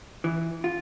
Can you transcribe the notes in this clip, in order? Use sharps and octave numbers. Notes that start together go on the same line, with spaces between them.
E3
F4